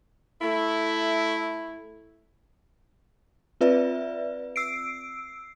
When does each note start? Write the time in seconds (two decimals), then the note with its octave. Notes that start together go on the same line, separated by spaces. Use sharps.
0.41 A3 E4
3.61 C4 F4 B4 D5 E5
4.56 E6 C7 D7